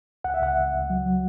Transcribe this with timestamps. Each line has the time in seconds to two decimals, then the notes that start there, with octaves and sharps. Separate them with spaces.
0.24 C#2 F#5
0.34 E5
0.41 C#2 F#5
0.58 C#2
0.73 C#2
0.90 F#3
1.06 F#3